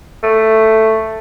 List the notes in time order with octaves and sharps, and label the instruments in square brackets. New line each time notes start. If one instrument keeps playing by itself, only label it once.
[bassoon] A3